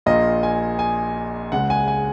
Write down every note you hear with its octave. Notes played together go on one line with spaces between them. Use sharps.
A#1 A#2 A#3 D#5
G#5
G#5
C#2 C#3 G#3 F#5
G#5
G#5